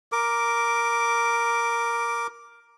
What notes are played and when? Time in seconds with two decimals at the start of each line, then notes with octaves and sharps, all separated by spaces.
0.12 A#4 D6